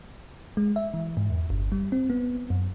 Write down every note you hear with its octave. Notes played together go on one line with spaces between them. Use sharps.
G#3
E5
E3
G#2
E2
G1
G3
C4
B3
F#2